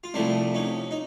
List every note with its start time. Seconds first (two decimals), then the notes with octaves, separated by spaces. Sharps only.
0.04 F4
0.14 C2 C3 F3 A3 D4 E4
0.55 C#4 D#4
0.91 D#4